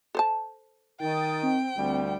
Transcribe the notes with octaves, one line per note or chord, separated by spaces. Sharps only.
A4 C5 A5
D#3 G5 D#6 A6
C4
D2 D3 G3